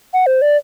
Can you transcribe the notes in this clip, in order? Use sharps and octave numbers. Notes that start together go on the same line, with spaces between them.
F#5
C5
D5